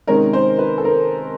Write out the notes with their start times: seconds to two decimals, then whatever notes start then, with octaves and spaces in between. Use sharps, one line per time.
0.07 C3 D#3 G#3 C#4 A#4
0.33 C5
0.59 B4
0.78 A4
0.85 A#4